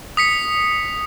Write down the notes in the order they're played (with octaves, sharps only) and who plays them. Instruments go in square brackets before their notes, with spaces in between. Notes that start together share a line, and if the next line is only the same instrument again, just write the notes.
[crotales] D#6 B6 C#7